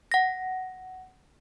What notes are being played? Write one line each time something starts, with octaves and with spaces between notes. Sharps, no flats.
F#5 A#6